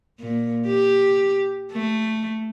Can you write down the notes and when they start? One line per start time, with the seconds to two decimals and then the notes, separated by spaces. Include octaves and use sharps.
0.20 A#2
0.67 G4
1.72 A3